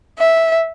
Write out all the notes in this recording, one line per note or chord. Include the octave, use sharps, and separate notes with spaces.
E5